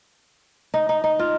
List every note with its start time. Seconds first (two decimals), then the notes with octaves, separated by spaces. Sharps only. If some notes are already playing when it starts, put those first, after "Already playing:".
0.74 D#4
0.89 D#4
1.04 D#4
1.19 F4